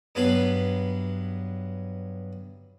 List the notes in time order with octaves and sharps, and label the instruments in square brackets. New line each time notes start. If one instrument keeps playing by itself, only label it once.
[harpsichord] G2 F#3 B3 A5 B5 C6